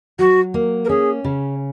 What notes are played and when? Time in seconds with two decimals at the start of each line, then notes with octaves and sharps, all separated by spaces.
0.19 F#3 F#4
0.54 A#3
0.85 A#4
0.89 C#4 G#4
1.24 C#3